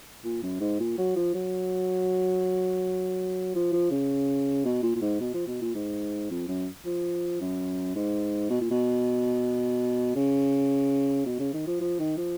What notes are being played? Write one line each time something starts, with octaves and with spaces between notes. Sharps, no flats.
A#2
F#2
G#2
A#2
F#3
F3
F#3
F3
F3
C#3
B2
A#2
A#2
G#2
B2
F3
B2
A#2
G#2
F2
F#2
F3
F#2
G#2
B2
A#2
B2
C#3
B2
C#3
D#3
F3
F3
D#3
F3